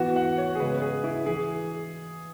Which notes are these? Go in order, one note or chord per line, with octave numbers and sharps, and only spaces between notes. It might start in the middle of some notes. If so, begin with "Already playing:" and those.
Already playing: E3 B3 F#4
F#5
C#5
G#4
C#3 G#3 B3 B4
B4
G#4
E4
E3 G#4